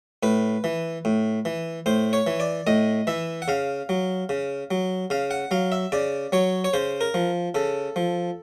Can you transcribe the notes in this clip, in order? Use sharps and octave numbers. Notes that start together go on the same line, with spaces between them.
A2 B4
E3
A2
E3
A2 C5
C#5
E3
D5
A2 D#5
E3 E5
F#5
C#3 F5
F#3
C#3
F#3
C#3 F5
F#5
F#3 F5
E5
C#3 D5
F#3 C#5
C#5
C#3 C5
A#4
F3
C#3 A4
F3